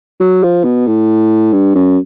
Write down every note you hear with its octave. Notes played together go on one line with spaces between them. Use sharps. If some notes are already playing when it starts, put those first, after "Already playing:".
F#3
F3
B2
A2
G2
F#2